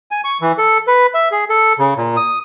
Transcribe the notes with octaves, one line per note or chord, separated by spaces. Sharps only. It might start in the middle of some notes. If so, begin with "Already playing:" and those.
G#5
C#6
E3
A4
B4
E5
G#4
A4
C#3
A#2
D#6